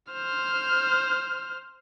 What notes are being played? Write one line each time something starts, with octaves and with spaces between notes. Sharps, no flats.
C5 F6